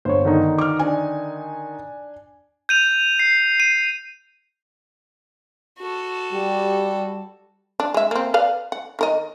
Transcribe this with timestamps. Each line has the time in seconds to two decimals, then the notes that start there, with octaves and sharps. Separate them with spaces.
0.05 G1 C5 C#5
0.25 D3 D#3 D#4
0.58 D6 F6
0.79 D4 G#5
2.69 G6 D#7 F7
3.19 C7
3.60 D#7
5.79 F#4 A4
6.33 G3 G4
7.80 D4
7.94 G#3 E5
8.11 A#3 C4
8.34 B4 D5 F5
8.72 F#5
8.99 D#3 A#4 D#5